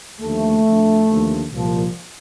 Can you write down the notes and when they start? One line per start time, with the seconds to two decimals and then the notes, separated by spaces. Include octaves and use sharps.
0.21 D#2 D3 F3 A3
0.64 F2 D3 F3
1.07 D#2 D3 F3
1.50 C2 A#2 F3